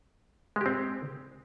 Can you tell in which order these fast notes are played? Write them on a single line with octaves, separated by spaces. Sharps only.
G#3 G4 C4